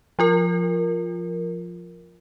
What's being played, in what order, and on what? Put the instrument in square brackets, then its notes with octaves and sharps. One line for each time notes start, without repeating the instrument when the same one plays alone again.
[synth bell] F3 F4 A#4